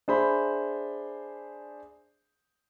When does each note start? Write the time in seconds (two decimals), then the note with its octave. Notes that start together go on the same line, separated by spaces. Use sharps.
0.08 D4 G#4 C5 E5 B5